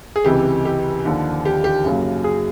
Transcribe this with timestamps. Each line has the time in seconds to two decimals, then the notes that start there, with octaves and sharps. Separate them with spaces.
0.16 G#4
0.24 C#2 C3 E3 G4
0.65 G4
1.05 D#2 D3 F3
1.45 G4
1.64 G4
1.84 F#2 C#3 F#3 A#3
2.24 G#4